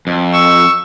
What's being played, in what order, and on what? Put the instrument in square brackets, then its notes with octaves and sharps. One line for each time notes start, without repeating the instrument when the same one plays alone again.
[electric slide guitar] F2
[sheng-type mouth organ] C#6 E6